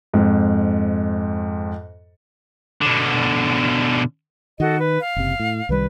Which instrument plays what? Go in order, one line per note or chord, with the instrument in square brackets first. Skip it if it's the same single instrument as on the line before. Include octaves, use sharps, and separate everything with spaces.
[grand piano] F2 G#2
[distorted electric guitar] B2 D3
[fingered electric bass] D#3 [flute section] F#4 A4 D#5
[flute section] B4
F5
[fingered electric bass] F#1 C3
A2
[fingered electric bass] C2 D#3 G3 [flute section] B4